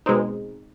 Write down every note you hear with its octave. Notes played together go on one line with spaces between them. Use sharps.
B2 G#3 C4 D#4